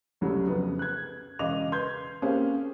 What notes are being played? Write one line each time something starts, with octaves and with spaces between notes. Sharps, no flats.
C2 C#3 F#3 G3 A3
F2 C#3 B3
F#6 G#6
E1 C#3 D#5 F5 D6 F7
B4 C6 G6 G#6
A#3 C4 C#4 G4 G#4 F5